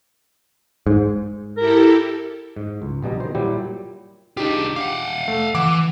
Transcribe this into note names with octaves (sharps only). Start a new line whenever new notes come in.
G#2
E4 G4 A4 A#4
G#2
C#2
A#1 B2 G3 D#5 A#5
D#3 C5
A#2 F#3 G3 E4 G4
D4 D#4 F4 G4 G#4
F5 F#5 D6
A3
E3 F#5 D6